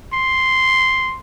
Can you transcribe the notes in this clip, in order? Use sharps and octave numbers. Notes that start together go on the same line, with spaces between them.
C6